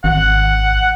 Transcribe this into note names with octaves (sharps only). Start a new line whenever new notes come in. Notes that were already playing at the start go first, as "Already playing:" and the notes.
G#1 F#5